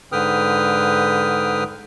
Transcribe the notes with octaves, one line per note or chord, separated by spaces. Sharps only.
G#2 D3 B4 G5 D#6 F6